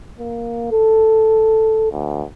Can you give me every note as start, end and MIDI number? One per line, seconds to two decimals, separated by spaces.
0.19 0.68 58
0.72 1.88 69
1.91 2.24 38